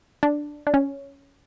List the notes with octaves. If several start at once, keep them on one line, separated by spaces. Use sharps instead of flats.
D4
D4
C#4